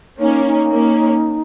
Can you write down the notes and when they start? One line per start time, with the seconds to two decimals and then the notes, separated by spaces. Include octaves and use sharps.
0.20 A#3 C#4 D#4
0.46 D#4
0.71 A#3 C#4